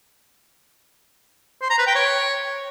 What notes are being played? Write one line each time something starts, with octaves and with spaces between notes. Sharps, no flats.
C5
A#5
B4
G5
C#5